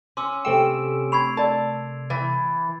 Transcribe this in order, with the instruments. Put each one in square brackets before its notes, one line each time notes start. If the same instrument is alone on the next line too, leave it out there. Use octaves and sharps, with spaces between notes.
[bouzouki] C#4 [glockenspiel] C6 D6 E6
[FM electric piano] C3 A3 E6 [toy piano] G5 [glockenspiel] D7
[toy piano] B5 C#6 [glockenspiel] G#6 C7 F7
[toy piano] A#4 D5 [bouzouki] A5
[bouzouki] E3 [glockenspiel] A6